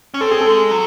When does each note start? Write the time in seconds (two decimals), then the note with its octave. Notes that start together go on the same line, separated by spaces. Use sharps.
0.14 C#4
0.21 C4 A4
0.31 G#4
0.41 A4
0.46 G#3
0.71 F#3